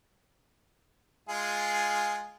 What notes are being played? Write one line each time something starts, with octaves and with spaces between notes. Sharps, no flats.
G#3 F4 G#4